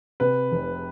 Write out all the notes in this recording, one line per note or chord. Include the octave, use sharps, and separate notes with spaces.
C3 B4
F1